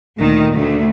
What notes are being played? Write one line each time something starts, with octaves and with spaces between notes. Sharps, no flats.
D2 A#2 D#3
D2 A3